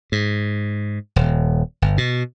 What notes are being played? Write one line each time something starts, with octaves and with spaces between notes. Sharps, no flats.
G#2
D#1
G1
B2